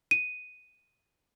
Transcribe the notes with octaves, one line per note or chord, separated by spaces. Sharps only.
D#7